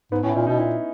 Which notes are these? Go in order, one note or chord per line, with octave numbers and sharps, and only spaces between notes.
G#2 B3
A2 C#4
E4
A#2 D#4
B2 D#4
A#2 E4